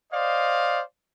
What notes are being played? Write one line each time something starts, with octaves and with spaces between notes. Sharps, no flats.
C5 D5 D#5 F5